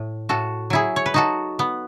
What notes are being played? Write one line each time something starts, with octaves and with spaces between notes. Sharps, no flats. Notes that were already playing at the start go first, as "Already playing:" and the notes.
Already playing: A2
A2 F#4 A4
F#3 E4 G#4
C#5
B4
D#4 F#4 A4
B3